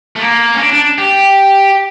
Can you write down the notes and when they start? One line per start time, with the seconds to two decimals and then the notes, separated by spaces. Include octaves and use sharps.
0.16 A3
0.21 A#3
0.54 C#4
0.60 D4
0.73 D4
0.98 G4